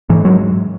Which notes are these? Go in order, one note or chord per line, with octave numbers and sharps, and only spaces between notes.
G#2 E3
F#3